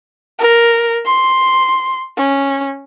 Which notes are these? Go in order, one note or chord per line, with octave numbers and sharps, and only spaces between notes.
A#4
C6
C#4